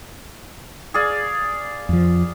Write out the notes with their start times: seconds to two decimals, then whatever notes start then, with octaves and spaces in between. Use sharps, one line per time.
0.94 G#4 D5 F5
1.89 F2 F3